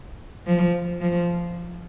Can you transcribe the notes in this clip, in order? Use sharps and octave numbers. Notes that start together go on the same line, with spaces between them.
F3
F3